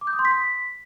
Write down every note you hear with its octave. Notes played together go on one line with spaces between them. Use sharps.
D6
G6
D#6
C6
B6